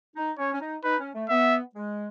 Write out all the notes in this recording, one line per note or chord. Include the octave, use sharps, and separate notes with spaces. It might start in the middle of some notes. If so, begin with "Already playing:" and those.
D#4
C#4 C#5
C#4
D#4
D#4 B4
C#4
A3
B3 E5
G#3